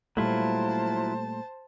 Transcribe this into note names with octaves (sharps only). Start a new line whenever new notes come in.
A#2 F#3 G3 A3 E4 F4 C5 A5